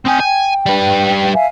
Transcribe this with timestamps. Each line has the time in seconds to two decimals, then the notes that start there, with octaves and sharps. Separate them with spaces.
0.05 C4 G5 G#5 D#6 G6
0.20 G5 G#5
0.66 G3 B4
1.34 E5 F5 G#5